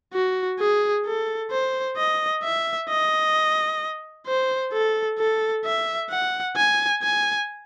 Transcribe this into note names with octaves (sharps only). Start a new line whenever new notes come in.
F#4
G#4
A4
C5
D#5
E5
D#5
C5
A4
A4
E5
F#5
G#5
G#5